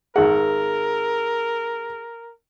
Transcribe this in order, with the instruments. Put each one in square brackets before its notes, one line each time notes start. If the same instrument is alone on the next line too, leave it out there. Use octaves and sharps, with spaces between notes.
[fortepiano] G#1 F#5 [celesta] G#4 [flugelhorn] A#4